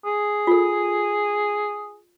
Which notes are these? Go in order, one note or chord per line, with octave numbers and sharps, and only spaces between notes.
G#4
F4 A4